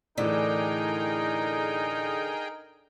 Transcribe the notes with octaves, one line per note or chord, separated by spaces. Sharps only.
A2 D3 E3 D#4 G#4 A#4 G5